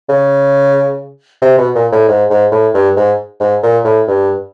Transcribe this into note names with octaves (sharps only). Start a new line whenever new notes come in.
C#3
C3
B2
A#2
A2
G#2
G#2
A2
G2
G#2
G#2
A#2
A2
G2